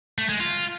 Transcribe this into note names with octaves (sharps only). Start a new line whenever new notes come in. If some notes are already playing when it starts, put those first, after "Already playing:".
A3
G#3
F4